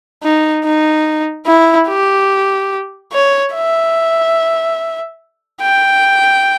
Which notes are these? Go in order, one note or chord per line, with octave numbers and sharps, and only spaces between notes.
D#4
D#4
E4
G4
C#5
E5
G5